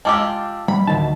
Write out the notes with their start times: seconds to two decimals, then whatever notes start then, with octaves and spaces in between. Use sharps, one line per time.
0.05 G#3 F4 G4 A5 D6 E6
0.68 G3 B5
0.87 D2 D#3 E3 A5